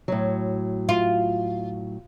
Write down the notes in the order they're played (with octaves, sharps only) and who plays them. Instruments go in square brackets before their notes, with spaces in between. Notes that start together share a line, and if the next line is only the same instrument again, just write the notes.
[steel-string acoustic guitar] A2 F#3
[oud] F4